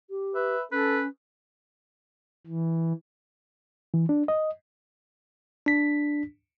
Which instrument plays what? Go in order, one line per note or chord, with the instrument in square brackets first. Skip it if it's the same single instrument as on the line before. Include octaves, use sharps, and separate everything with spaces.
[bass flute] G4
[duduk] B4 [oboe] E5
[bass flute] C#4 [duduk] A4 [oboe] B4
[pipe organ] E3
[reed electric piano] E3
D4
D#5
[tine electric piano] D4 B6